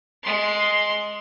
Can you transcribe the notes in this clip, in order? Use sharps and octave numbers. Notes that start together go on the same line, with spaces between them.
G#3 C6